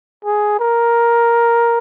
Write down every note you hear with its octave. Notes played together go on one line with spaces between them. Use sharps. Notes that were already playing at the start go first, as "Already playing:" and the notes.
G#4
A#4